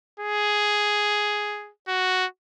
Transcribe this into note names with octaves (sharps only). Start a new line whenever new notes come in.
G#4
F#4